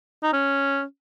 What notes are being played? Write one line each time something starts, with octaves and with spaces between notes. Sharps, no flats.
D#4
C#4